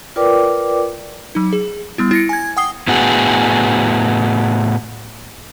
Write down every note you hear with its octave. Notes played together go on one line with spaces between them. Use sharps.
F4 A#4 B4 D5 G5 D6
F#3 D#4
G#4
G3 B3 E4
E4 A#6 C#7
G#5 G#6
F#5 G5 D#6 C7 G7
A2 B3 F#4 G#4